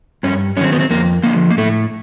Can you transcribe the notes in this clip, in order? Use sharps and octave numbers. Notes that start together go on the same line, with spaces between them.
G2 C#4
D#3 F#3 C4 C#4
B3
C4
F2 A#3
D3 F3 A#3
A#3
A2 A3